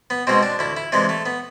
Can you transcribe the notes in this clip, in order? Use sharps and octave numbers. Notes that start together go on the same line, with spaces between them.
B3
B2 G#3 C4
D4
D2 E4
E4
C3 E3 G#3 D4
A3
B3